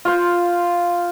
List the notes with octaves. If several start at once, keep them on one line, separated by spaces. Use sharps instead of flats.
F4 C5